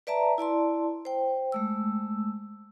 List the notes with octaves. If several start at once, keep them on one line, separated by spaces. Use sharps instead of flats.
B4 D5 E5 A5 A#5
E4 D5 A5 C6
C5 G5
G#3 A3 E6